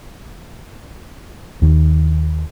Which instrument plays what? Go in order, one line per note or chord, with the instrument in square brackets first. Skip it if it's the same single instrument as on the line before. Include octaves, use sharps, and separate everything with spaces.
[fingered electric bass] D#2 D#3